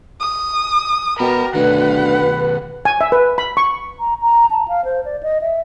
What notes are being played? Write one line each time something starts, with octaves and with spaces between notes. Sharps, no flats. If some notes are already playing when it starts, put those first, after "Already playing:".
D#6
B2 A#4 G5 B5
D2 B2 D#3 B4 F#5
G#5
E5
B4
B5
C#6
A#5
A#5
A5
F5
C5
D5
D#5
E5